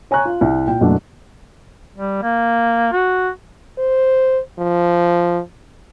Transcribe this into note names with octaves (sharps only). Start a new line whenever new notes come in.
C#5 G#5 A#5 C#6 F#6
F4
C2
A#2 G5
F#1 F#2 B2 A3 D4
G3
A#3
F#4
C5
F3